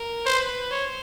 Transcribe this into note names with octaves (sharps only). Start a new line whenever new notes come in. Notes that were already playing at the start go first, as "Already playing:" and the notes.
Already playing: A#4
B4 C5
C5 C#5